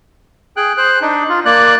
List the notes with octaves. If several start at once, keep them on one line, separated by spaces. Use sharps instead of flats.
G#4 G5 F#6
C5 F#6
D4 D#4
F4
A#3 D5 F#6